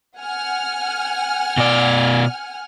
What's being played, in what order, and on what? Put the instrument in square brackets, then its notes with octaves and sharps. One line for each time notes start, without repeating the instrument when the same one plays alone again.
[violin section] F#5 G#5 F6
[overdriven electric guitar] B2 D5